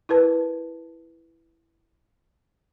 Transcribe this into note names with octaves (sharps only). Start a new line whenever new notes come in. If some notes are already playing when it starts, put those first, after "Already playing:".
E4 A#4 B4 A5